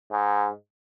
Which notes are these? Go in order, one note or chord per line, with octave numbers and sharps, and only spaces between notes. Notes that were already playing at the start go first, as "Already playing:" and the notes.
G#2